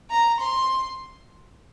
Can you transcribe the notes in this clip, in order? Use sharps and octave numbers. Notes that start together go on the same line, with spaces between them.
A#5
C6